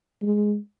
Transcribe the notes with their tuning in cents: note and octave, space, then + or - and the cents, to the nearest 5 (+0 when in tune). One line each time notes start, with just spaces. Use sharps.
G#3 +0